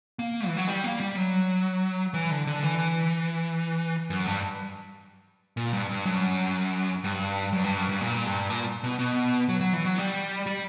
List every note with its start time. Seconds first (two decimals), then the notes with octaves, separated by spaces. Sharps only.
0.19 A#3
0.47 E3
0.57 F#3
0.67 G3
0.84 A#3
1.00 G3
1.17 F#3
2.14 E3
2.31 D3
2.47 D3
2.63 E3
4.10 F#2
4.26 G2
5.57 A#2
5.73 G2
5.90 G2
6.06 F#2
7.04 G2
7.53 F#2
7.64 G2
7.77 F#2
7.89 G2
8.01 A#2
8.26 G2
8.50 A#2
8.84 B2
8.99 B2
9.49 F#3
9.60 F#3
9.73 E3
9.85 F#3
9.98 G3
10.46 G3